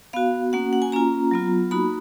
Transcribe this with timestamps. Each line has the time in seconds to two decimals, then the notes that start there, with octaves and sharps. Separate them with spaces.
0.13 B3 F#4 F5
0.53 A#3 C#4 F#4 F#5
0.73 F#5
0.82 G#5
0.92 A#3 C#4 F4 A#5
1.31 F#3 B3 F4
1.71 A#3 D#4 F#4 B5